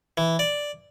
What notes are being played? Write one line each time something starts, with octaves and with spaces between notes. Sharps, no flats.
E3
D5